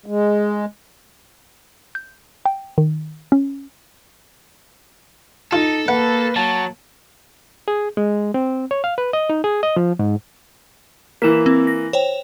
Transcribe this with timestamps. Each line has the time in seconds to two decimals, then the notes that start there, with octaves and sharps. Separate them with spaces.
0.06 G#3
1.95 G6
2.45 G5
2.78 D#3
3.32 C#4
5.53 D#4 F4 A4
5.88 A#3 B4 F#5
6.36 F#3 A5
7.68 G#4
7.97 G#3
8.34 C4
8.71 C#5
8.84 F5
8.98 B4
9.13 D#5
9.30 D#4
9.44 G#4
9.63 D#5
9.77 F3
9.99 G#2
11.22 E3 A#3 B6 E7
11.46 C4
11.67 A#6
11.93 C5 C#5 G5